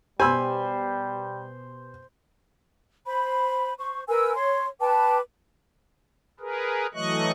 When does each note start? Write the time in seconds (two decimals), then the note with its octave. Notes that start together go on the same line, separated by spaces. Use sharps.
0.20 B2 G3 G4 C5 G#5 B5 E6
3.05 C5 B5
3.78 C5 C#6
4.08 A#4 B4 G#5 E6
4.35 C#5 C6
4.80 B4 G5 A5 D6
6.40 G#4 A#4 B4
6.94 E3 F#3 A3 D#5 C#6 F#6